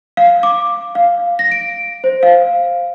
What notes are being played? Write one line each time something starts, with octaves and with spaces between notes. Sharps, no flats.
F5
D6
F5
A#6
D7
C5
F5